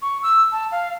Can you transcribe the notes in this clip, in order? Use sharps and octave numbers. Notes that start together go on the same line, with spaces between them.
C#6
E6
A5
F5